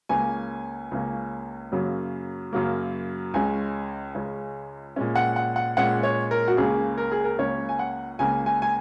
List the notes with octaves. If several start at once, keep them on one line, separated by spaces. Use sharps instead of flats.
C#2 C#3 A#3 C#4 G#5
C#2 C#3 A#3 C#4
F#2 C#3 F#3 A#3
F#2 C#3 F#3 A#3
C#2 C#3 G#3 C#4 G#5
C#2 C#3 G#3 C#4
A#2 G#3 C#4
F#5
F#5
F#5
A#2 G#3 C#4 F#5
C#5
A#4
F#4
C#2 C#3 A#3 C#4 G#4
A#4
G#4
A#4
C#2 C#3 A#3 C#4 C#5
G#5
F#5
C#2 C#3 A#3 G#5
G#5
G#5